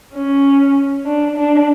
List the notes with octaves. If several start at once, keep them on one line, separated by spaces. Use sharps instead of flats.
C#4
D4
D4